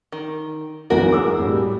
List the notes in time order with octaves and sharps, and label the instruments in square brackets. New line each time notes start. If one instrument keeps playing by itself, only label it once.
[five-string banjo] D#3
[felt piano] B1 E2 E3 [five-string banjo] F#4 A#4
[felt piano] G#4 D6 E6
A2 G3